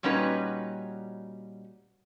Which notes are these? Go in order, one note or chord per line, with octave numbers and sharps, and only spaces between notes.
A#2 G3 C#4 D#4 F#4 B4